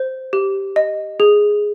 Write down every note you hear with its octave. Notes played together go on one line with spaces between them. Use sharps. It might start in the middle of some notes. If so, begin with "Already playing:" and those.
Already playing: C5
G4
D#5
G#4